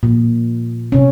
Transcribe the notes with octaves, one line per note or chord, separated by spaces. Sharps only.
A#2
C3 C#4